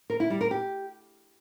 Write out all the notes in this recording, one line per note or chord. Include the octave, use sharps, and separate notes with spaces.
A#4
E4
G3
A#4
G4